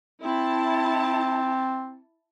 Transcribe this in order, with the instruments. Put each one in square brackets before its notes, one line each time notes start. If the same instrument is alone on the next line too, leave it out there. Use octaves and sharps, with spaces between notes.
[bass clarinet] C4 [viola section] E4 A5